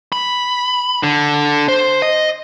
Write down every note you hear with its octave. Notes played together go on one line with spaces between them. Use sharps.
B5
D3
C5
D#5